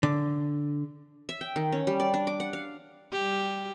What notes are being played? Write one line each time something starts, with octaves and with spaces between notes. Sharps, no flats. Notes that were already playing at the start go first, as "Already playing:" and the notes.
D3
E5
G5
D#3
C#4
G3
D5
D4
D6
F#5
F5
G3 G4